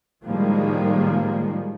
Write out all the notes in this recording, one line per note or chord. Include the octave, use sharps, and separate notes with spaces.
A2 D#3 F3 G3 G#3 A#3